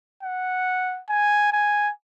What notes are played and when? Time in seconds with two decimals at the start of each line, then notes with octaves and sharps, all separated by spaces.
0.23 F#5
1.09 G#5
1.53 G#5